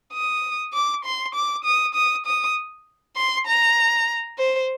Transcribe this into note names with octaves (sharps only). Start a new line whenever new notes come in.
D#6
D6
C6
D6
D#6
D#6
D#6
C6
A#5
C5